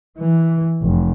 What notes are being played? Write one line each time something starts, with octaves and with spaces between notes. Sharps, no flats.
E3
F1